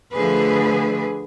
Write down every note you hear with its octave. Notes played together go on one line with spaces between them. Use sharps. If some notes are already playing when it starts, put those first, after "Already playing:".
D3 F3 A3 G#4 B4